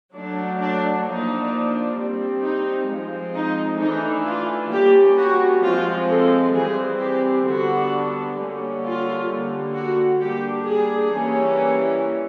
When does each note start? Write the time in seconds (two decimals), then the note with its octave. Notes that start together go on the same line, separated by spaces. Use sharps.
0.14 F#3 A3 D4
0.60 D4
1.05 F3 A#3 D4 D#4
1.97 G3 C4
2.43 D#4
2.89 F3 G#3 C4
3.34 D#4
3.81 E3 A3 D4 D#4
4.26 F4
4.71 G3 A#3 C#4 G4
5.17 F#4
5.63 F3 G#3 C4 F4
6.09 A4
6.54 E3 G3 C4 G#4
7.00 G4
7.46 D3 G3 B3 D4 F#4
8.38 D3 G3 A#3 C#4
8.84 F4
9.29 D3 G3 A#3
9.75 F#4
10.20 G3 A#3 D4 G4
10.66 G#4
11.12 E3 G3 A#3 C#4